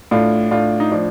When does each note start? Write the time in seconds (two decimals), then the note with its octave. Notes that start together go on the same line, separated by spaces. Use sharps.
0.11 A2 D4 F4
0.51 A2 D4 F4
0.80 D#4
0.92 F3 D4